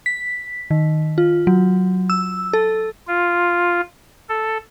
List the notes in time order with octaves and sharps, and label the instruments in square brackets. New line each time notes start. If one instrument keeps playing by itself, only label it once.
[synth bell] B6
D#3
F4
F#3
E6
A4
[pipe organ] F4
A4